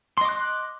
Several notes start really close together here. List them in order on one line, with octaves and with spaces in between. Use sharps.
C6 D#5 D6 F#6